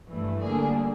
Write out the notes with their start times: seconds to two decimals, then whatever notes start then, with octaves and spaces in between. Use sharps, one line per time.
0.10 G2 E3 A3
0.43 D2 D3 G3 A#3 D4 G#4